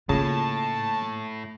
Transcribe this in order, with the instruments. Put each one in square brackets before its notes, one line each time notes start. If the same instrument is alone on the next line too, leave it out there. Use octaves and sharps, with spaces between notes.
[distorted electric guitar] A2 [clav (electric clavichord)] C#3 [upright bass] A#3 F4 [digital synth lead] A5